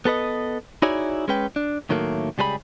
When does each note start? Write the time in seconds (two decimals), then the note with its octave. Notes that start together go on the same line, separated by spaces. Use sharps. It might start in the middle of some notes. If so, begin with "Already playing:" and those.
0.05 B3 A4 B4 D#5
0.82 D#4 E4 F#4 G#4 C#5 D5
1.28 G#3 C#4 B4 G5
1.56 D4
1.89 A2 D#3 F#3 A3 A#3
2.38 C#2 G3 G#4 B4 B5